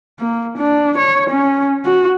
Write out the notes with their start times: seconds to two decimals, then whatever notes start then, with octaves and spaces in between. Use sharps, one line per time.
0.19 A#3
0.57 D4
0.98 C#5
1.30 C#4
1.85 F#4